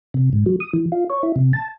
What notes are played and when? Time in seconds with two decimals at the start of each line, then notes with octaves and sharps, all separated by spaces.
0.14 C3
0.33 G#2
0.46 F#3
0.60 D#6
0.73 E3
0.92 F4
1.10 C#5
1.23 E4
1.36 C3
1.53 A5